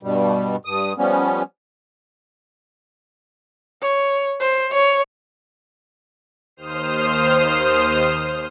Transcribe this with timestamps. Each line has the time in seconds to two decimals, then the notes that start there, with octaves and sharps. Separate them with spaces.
0.03 G2 B2 G3
0.65 G2 D#6
0.98 F3 G3 B3 C#4
3.82 C#5
4.40 C5
4.73 C#5
6.56 D#2 C5 D#6 F6 C7